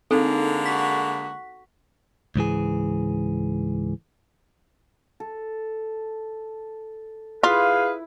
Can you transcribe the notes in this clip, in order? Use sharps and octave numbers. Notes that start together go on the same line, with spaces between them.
D3 G#3 A#3 C4 D#4 A4
F#4 B6
C#2 G#2 E3 G#4
A4
E4 F4 G#4 B4 F5